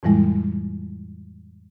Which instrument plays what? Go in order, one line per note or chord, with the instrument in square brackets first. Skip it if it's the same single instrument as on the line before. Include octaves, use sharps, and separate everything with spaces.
[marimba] F2 A2 E3 G3 G#3 E4